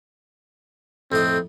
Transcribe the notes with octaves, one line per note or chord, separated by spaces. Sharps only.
F2 A2 C4 D#5